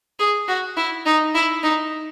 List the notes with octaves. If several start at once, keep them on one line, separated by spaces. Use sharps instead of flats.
G#4
F#4
E4
D#4
E4
D#4